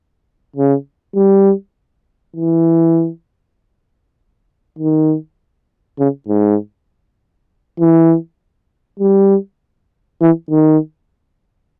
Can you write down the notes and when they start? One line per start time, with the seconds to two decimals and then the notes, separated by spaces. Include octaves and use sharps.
0.56 C#3
1.16 G3
2.36 E3
4.79 D#3
5.99 C#3
6.28 G#2
7.80 E3
9.00 G3
10.21 E3
10.51 D#3